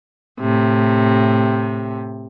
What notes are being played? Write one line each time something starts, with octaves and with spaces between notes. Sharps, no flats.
A2 C3